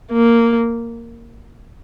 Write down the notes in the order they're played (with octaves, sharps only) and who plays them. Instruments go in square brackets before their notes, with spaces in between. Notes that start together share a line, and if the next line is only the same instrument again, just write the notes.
[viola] A#3